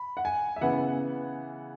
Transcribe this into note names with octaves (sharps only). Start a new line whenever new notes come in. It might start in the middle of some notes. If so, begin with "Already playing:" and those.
Already playing: B5
F#5
G#5
E5
C#3 E3 B3 E4 F#5